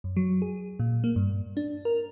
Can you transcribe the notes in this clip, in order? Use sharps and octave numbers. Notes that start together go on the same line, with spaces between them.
F#2
F#3
G#4
A#2
A#3
G2
D4
A#4